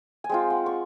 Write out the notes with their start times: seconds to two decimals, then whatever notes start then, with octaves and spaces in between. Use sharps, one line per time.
0.24 G#5
0.29 G#3 C4 F4 G5
0.50 F#5
0.66 C#6